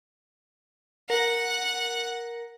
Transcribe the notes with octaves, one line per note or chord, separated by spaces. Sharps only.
A#4 F#5